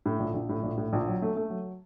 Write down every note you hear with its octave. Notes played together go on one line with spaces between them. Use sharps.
A2
A#1
A#1
A2
A#1
A2
A#1
F#3
A3
A3
F#3